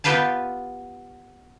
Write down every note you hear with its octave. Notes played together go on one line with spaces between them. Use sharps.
B3 F4 G4 B4 F5 A5